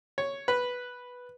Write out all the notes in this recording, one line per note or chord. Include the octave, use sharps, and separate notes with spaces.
C#5
B4